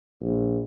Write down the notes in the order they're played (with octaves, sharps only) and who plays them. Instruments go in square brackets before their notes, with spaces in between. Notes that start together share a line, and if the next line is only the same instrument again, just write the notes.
[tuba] A#1